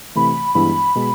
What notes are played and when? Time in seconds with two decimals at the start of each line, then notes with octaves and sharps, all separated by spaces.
0.16 C3 E3 A3 B5
0.55 G2 E3 G#3 B3 E4 B5
0.95 B2 G#3